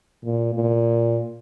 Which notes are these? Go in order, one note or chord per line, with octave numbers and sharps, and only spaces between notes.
A#2
A#2